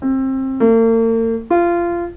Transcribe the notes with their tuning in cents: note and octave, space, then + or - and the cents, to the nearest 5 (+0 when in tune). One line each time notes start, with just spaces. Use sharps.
C4 +25
A#3 -45
F4 -20